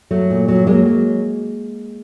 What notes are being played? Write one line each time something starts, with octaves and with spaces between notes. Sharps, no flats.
F#3 A3
A#2
F#3
F#3 G#3 A#3
F#3